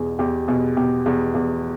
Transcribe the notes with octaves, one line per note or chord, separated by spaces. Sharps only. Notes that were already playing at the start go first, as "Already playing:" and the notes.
Already playing: E2 B2 G#4
E2 G4
B2 G#4
B2 G4
E2
E2